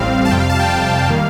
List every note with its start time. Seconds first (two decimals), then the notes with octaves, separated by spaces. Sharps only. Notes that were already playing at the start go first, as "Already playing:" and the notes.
Already playing: A1 A2 G3 C4 F5
0.25 A5
0.30 F2 C3 G3 G5
0.40 F5
0.49 A5
0.60 G5
0.70 F5
1.08 D#3 G3 A#3